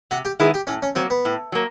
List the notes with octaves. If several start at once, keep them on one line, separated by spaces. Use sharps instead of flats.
C3 F#4
G4
D#3 G#3 B3 E4 G#4
G4
A2 C#4
C#4
F#3 A#3 C4
B3
A2
F#3 A#3